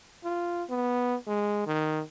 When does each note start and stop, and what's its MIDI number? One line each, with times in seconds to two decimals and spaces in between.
0.24 0.63 65
0.69 1.15 59
1.27 1.64 56
1.66 2.02 51